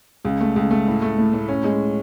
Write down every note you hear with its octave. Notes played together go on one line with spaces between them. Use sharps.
C#2
A3
C#2
A3
A2
A3
A2
A2
C#4
G#3